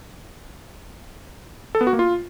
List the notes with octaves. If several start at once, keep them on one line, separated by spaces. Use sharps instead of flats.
A4
B3
F#4
A#3
F4